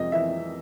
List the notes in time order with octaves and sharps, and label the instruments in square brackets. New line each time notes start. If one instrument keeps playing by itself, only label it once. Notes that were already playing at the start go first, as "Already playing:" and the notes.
Already playing: [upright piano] F2 C3 G#3 D#5
E3 E5